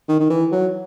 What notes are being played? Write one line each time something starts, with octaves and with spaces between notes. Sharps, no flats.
D#3
D#3
E3
F#3